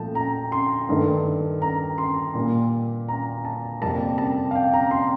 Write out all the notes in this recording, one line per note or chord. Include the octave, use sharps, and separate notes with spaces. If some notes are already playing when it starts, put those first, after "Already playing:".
Already playing: A#2 F3 A3 G5 A5
A#5
C6
G2 D#3 A3
A#5
C6
A#2 G3 A#3
A#5
A5
F2 C3 G3 A#3 A5
A5
F5
G5
A#5
C6